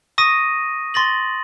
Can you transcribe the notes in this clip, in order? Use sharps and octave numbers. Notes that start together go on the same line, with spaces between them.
C#6 D#6 A#6 D#7
C6 A6 A#6 F#7